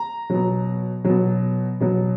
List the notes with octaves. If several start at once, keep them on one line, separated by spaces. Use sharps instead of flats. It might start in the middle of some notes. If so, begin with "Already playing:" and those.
Already playing: A#5
B2 F#3
B2 F#3
B2 F#3